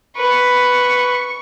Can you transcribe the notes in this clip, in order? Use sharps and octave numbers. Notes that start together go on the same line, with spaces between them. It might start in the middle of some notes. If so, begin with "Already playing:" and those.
B4 C#6